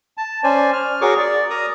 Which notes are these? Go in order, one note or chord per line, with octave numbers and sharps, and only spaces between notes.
A5
C#4 C5 D5 G#5
F6
F#4 G#4 A#4 C#5 C#6 D6
D5
A#4 A#5 D#6